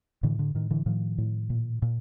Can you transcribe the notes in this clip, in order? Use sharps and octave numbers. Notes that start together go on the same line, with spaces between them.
A2 D3 E3
D3
A2 D#3
D3 E3
A2 D#3 F3
A2
A#2
A#2